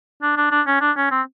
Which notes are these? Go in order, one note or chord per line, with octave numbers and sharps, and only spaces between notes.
D4
D4
D4
C#4
D4
C#4
C4